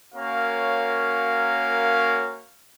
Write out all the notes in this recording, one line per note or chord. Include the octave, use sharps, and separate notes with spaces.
A#3 C#4 F#4 A#4 C#5 F5